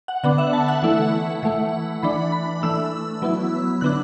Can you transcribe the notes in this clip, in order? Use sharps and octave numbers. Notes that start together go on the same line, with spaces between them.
F#5
D3 B3 D4 F#5
E5
A5
F#5
E3 A3 E4
E3 A3 E4
E3 D4 B5
B5
E3 A3 D4 E6
F#3 B3 E4
D3 B3 D4 F#6